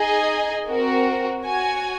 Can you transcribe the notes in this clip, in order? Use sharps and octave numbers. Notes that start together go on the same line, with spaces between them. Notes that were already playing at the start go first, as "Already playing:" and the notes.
Already playing: D#4 G#4 D#5 G#5
C4 F#4 A#4
F#4 C#5 G#5